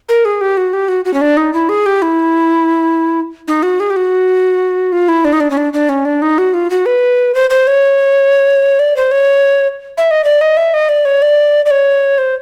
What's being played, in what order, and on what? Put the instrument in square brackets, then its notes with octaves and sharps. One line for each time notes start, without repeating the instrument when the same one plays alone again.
[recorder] A#4
G#4
G4
F#4
G4
F#4
F#4
C#4
D4
D#4
E4
G#4
G4
E4
D#4
F#4
G#4
G4
F#4
F4
E4
D4
D#4
D4
C#4
D4
D4
C#4
D4
D#4
F#4
F4
F#4
B4
C5
C5
C#5
D5
C5
C#5
E5
D#5
D5
D#5
E5
D#5
D5
C#5
D5
D5
C#5
C5